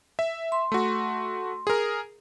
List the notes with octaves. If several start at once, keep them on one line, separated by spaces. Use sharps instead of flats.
E5
C6
A3 F#4
G#4 A#4